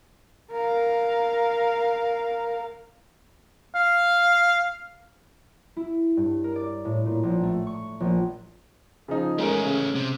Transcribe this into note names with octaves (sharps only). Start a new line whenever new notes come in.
A#4 F5
F5
E4
G2
A#4
D5
A2
A#2
A#1
A3
C#6
A#1
C#3 F3 D#4
G#3 A3 C#4 A#4 D7
C#3
C3